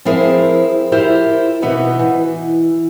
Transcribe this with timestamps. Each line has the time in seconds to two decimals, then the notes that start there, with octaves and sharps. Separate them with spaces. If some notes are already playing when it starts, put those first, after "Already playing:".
0.05 F3 C4 E4 G#4 A#4 C5
0.92 E4 F4 G4 A#4 C5
1.62 B2 E3 B3 D#4 F#4 B4
1.99 E3